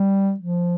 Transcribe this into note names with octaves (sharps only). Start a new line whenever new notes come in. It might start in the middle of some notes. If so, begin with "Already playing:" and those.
Already playing: G3
F3